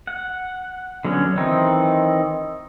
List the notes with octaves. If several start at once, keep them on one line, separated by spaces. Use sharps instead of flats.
F#5
D3 F#3 B3 C#4
D#3 E3 C4 D#4